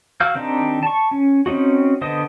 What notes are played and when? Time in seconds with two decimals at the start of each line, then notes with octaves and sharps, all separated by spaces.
0.20 F#4 F5 E6 F6 G6
0.35 D#3 C4 D4 D#4 G4
0.83 A5 C#6
1.11 C#4
1.46 C4 C#4 D#4 F#4
2.01 D3 B3 C5 D#5 D#6